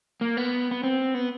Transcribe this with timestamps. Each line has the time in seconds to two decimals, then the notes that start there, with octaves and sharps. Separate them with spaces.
0.21 A#3
0.37 B3
0.71 B3
0.83 C4
1.14 B3